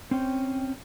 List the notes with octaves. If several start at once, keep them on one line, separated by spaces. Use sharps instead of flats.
C4 C#4 G5